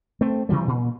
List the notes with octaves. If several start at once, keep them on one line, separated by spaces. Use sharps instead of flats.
A3 C4
C3 E3 F3 G3
A#2